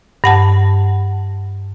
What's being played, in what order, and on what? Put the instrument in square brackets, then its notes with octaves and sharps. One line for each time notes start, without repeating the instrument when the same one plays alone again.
[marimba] G2 F#5 A5